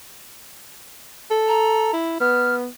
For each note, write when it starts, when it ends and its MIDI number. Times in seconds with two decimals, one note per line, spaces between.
1.31 1.89 69
1.48 1.93 82
1.93 2.19 64
2.20 2.67 59
2.20 2.55 89